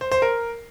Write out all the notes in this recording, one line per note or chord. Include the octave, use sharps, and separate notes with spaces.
C5
C5
A#4